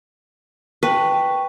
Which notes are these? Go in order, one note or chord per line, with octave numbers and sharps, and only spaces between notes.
B4 G5 A5 C#6